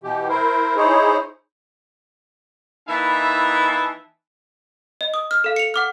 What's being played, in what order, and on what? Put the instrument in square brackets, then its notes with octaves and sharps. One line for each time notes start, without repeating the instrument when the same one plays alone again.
[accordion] B2 E3 G4
E4 A#4 C5
D#4 E4 G#4 C5 C#5
[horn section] E3 A#3 D#4 E4 E5 A5
[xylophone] D#5
D#6
F6
A4 F5
C#7 F7
F#5 D6 F6